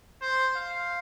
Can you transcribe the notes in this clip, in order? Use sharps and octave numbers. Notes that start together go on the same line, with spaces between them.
C5
F5